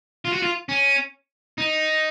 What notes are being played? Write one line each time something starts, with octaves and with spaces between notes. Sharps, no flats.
F4
F#4
F4
C#4
D#4